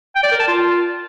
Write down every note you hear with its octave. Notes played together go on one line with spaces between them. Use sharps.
G5
D5
A#4
A5
F4